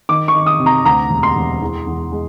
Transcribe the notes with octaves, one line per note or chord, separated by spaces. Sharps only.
D#3 D6
C#6
D#3
D#6
C3
A#5
D2 A#5
E1
C6
E1
E2
E2
G#3